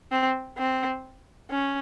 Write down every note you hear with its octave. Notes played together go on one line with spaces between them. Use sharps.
C4
C4
C#4